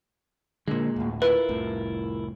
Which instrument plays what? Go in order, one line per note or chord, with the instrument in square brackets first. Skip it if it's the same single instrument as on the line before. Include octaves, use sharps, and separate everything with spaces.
[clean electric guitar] A#2 G#3 [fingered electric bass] D3 A#3
[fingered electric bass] D1 A2
[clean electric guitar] E4 F4 A#4 [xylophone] B4
[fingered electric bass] F1 C2 A2